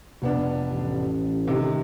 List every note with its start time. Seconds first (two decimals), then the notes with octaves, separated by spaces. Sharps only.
0.22 F1 B3 D4
0.68 A1
1.47 C3 D#3